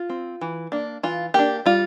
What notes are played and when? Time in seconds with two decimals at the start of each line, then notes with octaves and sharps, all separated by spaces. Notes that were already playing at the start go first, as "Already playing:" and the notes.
Already playing: F4
0.09 C4
0.41 E3
0.72 A#3 D4
1.03 E3 F4
1.34 A#3 D4 G4
1.66 G3 F4